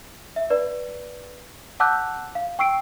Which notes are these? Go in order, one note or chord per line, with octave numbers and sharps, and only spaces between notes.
E5
B4 D5
F#5 A5 D6 E6 F#6 G6
F5
G5 C#6 E6 C7 D7